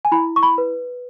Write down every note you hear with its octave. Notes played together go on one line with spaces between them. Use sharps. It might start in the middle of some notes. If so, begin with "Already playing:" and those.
G#5
E4 B5
C#6
B5
B4